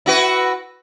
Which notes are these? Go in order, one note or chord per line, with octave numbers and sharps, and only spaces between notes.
E4 F#4 B4